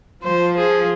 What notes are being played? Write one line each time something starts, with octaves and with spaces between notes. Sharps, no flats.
F3 C5
G#4